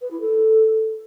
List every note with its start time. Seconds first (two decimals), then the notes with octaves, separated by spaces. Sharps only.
0.01 B4
0.10 E4
0.20 A4